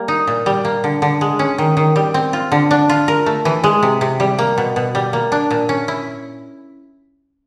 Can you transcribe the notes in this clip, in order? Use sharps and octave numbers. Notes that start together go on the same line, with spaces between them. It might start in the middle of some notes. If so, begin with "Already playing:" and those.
Already playing: G3 A#3
D#4
A#2
G3
A#3
D3
D3
G#3
C#4
D#3
D#3
G3
C4
F4
D3
D4
F4
A#4
A3
E3
G#3
C3
C3
G3
A#3
B2
B2
G3
A#3
D4
A#2
C#4
E4